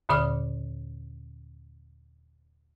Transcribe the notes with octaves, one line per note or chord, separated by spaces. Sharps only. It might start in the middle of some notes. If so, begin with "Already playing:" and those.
D#2 A#2 D3 D5 D6 F6